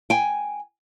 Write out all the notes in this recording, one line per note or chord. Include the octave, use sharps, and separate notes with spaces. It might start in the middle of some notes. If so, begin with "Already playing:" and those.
G5 G#5